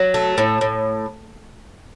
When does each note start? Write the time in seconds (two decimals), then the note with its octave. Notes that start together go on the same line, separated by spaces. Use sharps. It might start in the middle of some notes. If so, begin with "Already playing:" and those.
Already playing: F#3
0.14 A3
0.38 A2
0.61 A2